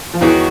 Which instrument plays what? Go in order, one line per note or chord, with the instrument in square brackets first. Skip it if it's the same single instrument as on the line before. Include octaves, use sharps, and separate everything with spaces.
[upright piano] F3
[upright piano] E2 E3 [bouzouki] D#3 G#3 C#4 F#4